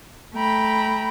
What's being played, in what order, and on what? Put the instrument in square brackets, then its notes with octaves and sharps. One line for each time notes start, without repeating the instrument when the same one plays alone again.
[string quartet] A3 G5 A#5 B5